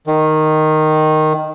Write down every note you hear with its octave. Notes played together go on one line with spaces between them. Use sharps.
D#3